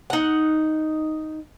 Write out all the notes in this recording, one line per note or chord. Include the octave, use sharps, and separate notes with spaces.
D#4 F#5